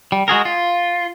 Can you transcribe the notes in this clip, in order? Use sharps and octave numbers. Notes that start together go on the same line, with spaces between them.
G3
G#3 F#4 G#4 A#4
F4